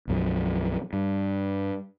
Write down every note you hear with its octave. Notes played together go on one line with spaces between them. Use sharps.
B1 F#2 F3
G2